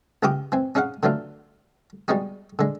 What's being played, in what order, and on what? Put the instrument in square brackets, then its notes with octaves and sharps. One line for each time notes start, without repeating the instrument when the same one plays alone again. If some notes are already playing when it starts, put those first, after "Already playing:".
[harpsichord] C#2 E3 F4 G4 D6 D#6
E3 C4 G#5
C#4 D#4 G#4 F5 F#5
D3 E3 F#3 A3 F4
G3 G#3 B3 D#4 F#4
D3 G#3